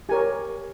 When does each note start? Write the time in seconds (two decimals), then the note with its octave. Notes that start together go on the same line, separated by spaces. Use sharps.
0.09 G4 A#4 C#5 G#5